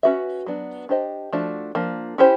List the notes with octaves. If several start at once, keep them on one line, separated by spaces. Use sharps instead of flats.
C#4 F#4 B4 E5
F#3 B3 D4
D4 G4 C5 D#5
F3 A3 D4 F#4
F3 A#3 D4
C#4 E4 G4 C5